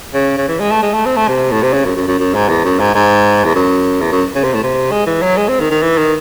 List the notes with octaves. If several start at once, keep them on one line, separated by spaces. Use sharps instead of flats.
C#3
C#3
E3
G#3
A3
G#3
A3
C4
A3
C3
A2
C3
C#3
F#2
F#2
F#2
F#2
G#2
E2
F#2
G#2
G#2
E2
F#2
E2
F#2
C#3
C3
A2
C3
G#3
E3
F#3
G#3
C4
D#3
D#3
E3
D#3